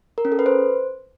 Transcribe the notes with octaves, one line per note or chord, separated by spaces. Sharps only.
A#4
C#4
A4
B4
C5